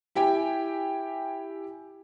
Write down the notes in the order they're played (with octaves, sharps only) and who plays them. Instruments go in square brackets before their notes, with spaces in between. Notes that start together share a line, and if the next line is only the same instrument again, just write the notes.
[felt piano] E4 G4 G5 G#5